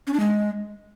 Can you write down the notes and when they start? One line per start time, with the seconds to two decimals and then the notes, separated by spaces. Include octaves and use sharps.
0.07 C#4
0.13 D4
0.20 G#3